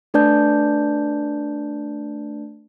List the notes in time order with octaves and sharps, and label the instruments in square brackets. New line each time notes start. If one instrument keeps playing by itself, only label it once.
[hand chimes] A3 D4 B4 D5 A5 G6